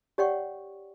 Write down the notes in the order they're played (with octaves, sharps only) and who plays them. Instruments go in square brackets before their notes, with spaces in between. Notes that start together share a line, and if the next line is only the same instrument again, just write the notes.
[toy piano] G4 C#5 D5 F#5 G5 C#6